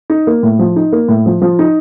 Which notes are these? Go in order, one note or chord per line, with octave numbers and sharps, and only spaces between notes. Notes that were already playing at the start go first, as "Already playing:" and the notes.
D#4
A#3
A2
F3
D#4
A#3
A2
F3
F3
D#4